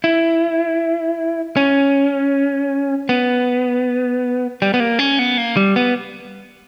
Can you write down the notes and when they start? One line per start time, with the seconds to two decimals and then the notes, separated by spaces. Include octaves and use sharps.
0.04 E4
1.57 C#4
3.09 B3
4.62 G3
4.74 B3
4.80 A#3
4.99 C#4
5.19 B3
5.38 A#3
5.57 G3
5.76 B3